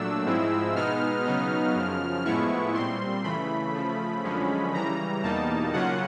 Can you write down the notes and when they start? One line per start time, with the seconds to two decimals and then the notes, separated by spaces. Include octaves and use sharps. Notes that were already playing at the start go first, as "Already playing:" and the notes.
Already playing: A#2 F#3 A3 D4 E6
0.26 G#2 F3 G#3 C4 E4
0.75 B2 G#3 B3 D#4 F6
1.25 C#3 F#3 B3 D#4
1.75 F#2 C#3 F3
2.25 A2 F3 G#3 B3 E4 C#6
2.74 A#2 G3 C4 C6
3.24 C#3 E3 A3 B5
3.73 C#3 F3 A3
4.23 F#2 D3 F3 G#3 C#4
4.73 C#3 E3 G3 A#5
5.23 E2 B2 G3 A#3 D#4 A5
5.73 C#3 F#3 A#3 C#4 F4 F#5